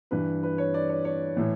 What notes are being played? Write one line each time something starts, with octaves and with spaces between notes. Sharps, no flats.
G2 E3 B4
B4
C#5
D5
C#5
C#5
A2 E3